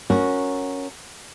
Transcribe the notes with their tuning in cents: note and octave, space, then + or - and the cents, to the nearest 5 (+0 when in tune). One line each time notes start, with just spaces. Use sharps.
C#4 +0 F#4 -10 A#4 +0